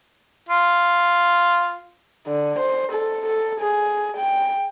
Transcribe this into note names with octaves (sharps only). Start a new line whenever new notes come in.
F4
D3
C5
A4
A4
G#4
G5